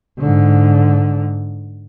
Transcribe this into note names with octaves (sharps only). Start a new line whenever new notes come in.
G#2 D3